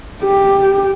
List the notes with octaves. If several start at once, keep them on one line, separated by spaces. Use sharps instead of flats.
G4